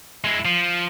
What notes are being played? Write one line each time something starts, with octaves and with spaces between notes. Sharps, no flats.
G#3 E4
F3